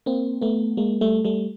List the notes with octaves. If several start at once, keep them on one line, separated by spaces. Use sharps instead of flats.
A#3 C4
A3 B3
G#3 A#3
G3 A3
G3 A3